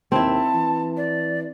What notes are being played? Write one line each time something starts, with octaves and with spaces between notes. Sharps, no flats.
D#2 C4 E4 A5
E3
D5